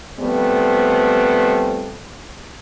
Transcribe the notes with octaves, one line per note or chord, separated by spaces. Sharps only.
F3 G3 A3 B3 C4